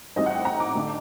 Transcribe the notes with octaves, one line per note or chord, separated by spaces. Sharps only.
A1 A2 G3 C4 D#4 D#5
F#5
G5
A#5
D6
D3 A3 D#4